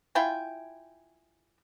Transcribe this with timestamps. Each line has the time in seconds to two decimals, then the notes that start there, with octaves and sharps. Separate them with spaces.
0.15 E4 F4 G5 G#5